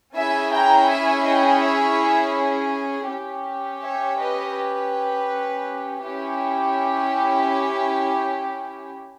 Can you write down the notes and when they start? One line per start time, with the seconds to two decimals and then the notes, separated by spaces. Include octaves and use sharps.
0.15 C#4 E4 G#4 E5 G#5
0.52 G5 A#5
0.89 E5 G#5
1.25 D#5 G5
1.62 C#5 E5
3.08 C#4 G4
3.82 C#5 E5
4.18 B4 D#5
4.55 B4
6.02 C#4 E4 G4